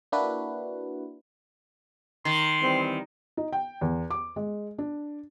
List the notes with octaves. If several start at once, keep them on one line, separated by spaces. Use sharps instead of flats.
A#3 D4 E4 F#4 B4
D#3 C6
E3 G3 C4
D#4
G5
E2
D6
G#3
D4